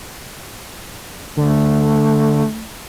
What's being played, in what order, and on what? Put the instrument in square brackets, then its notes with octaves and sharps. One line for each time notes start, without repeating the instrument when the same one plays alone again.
[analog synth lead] D3 [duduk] A3